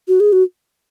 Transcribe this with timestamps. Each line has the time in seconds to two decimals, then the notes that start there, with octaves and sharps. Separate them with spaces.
0.08 F#4
0.20 G#4
0.32 F#4